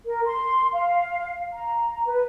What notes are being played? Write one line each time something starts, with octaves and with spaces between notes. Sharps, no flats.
A#4
C6
F5
A#5
B4